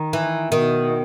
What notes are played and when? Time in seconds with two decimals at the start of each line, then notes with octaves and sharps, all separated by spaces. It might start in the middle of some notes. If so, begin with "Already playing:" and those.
Already playing: D#3
0.13 E3
0.52 B2 D#3